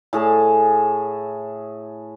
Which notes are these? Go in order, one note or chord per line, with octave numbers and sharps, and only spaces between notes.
A2 G#4 A5